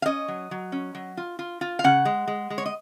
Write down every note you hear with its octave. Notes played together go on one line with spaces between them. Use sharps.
F5
C#4 D#5
F#3
F#3
C#4
F#3
F4
F4
F4
F5
C#3 F#5
G#3
G#3
G#3
C#5
D#5